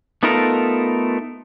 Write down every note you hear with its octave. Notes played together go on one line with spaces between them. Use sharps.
A3 B3 D#4 F4 A4 A#4